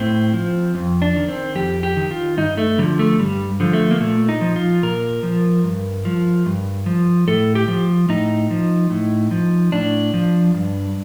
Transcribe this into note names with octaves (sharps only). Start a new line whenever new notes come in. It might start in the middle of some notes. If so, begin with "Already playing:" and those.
Already playing: A2 C4
F3
F2
D4
D#3
C4
F2 G4
G4
D#3
F4
G2 D#4
A3
D3 F3 G3
A3
G2 G3
D3 F3
A3
A#3
A#2 A3
D#4
F3
F4
A#2 A#4
F3
G2
F3
G2
F3
A2 A4
G4
F3
A2 D#4
F3
A2
F3
A2 D4
F3
G2